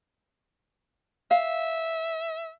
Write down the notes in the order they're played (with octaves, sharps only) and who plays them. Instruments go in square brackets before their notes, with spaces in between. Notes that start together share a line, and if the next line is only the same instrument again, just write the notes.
[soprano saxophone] E5 [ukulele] F5